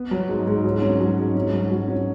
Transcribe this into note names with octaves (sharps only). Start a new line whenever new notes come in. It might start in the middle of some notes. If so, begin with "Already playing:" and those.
Already playing: B3
F#3
G#2
G#2
F#3
C#4
F#3
G#2
C#4
F#3
F#3
C#4